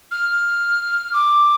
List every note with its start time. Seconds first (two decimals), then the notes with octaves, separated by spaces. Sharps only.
0.11 F6
1.13 D6